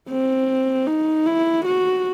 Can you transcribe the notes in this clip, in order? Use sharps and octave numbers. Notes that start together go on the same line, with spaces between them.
C4
D#4
E4
F#4